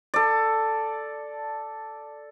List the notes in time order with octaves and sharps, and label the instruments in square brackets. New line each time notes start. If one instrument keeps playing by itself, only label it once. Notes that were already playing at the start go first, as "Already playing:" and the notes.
[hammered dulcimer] A4 D5